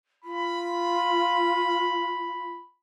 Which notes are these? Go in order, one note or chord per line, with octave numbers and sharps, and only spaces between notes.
F4 B5